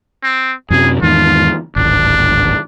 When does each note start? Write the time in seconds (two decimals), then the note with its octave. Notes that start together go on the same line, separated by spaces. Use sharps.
0.23 C4
0.71 F#2 C3 F#3 G#4
1.02 E2 G#2 D#3 F4
1.76 D1 G#1 D4